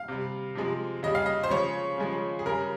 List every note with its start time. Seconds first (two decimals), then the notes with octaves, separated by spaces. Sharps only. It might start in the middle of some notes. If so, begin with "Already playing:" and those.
Already playing: F5
0.08 C3 G3
0.55 C3 F3 G#3
1.03 C#3 G3 D#5
1.15 F5
1.26 D#5
1.43 C5
1.50 C#3 F3 G#3 C#5
1.98 C#3 F3 G#3
2.39 G#4
2.46 C#3 G3 A#4